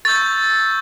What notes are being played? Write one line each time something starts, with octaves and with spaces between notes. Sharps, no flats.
C#6 E6 G6 A6